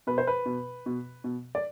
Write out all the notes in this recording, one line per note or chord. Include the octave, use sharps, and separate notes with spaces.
B2 B4
C5
B4
B2
B2
B2
D5